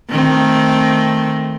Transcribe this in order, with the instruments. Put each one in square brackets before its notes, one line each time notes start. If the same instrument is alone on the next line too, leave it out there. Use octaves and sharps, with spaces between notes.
[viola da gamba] D#3 A3 C4